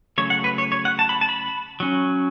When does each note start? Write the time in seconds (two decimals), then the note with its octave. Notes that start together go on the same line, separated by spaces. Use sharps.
0.18 C#3 F#3 A3 C#5
0.30 F#5
0.44 B4
0.58 C#5
0.72 C#5
0.85 F#5
0.99 A5
1.09 B5
1.21 A5
1.29 B5
1.80 F#3 C#4